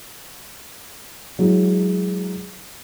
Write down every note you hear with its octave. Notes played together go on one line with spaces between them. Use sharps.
F#3 G#3 E4